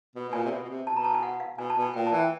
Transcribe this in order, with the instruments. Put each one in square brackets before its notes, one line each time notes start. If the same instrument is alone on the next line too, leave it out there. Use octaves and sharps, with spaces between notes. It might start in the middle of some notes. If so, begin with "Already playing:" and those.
[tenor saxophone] B2
B2
[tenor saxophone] A#2 [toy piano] G#5
[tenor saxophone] C3
B2
B2
C3
[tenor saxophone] B2 [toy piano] A5
[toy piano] A#5
A5
G#5
F#5
F5
[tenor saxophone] B2 [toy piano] G#5
[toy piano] A5
[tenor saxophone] B2
[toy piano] G#5
[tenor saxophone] A#2 [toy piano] G5
[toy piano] A5
[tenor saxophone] E3
[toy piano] G5